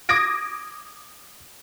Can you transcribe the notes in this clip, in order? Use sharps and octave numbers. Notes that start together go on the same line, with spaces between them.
D6 D#6 G#6 A#6 D7